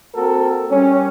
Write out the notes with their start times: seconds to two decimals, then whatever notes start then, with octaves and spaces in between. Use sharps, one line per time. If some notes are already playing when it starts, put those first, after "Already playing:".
0.14 A#3 C4 F#4 A4 A#4
0.70 G3 C#4